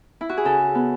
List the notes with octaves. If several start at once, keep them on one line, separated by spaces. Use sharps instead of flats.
E4
F#4
G#4
C#3 A4
B3